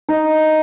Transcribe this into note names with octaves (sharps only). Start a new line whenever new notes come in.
D#4